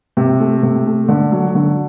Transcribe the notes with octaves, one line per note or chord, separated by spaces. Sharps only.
C3
A3
C3
A3
D3
F#3
D3